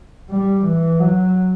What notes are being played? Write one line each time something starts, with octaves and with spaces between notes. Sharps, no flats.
G3
E3
F#3